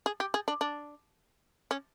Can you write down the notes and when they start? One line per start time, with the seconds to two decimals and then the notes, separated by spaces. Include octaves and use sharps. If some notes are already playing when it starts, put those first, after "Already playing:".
0.06 G#4
0.20 G4
0.34 G#4
0.48 D4
0.61 D4
1.71 C#4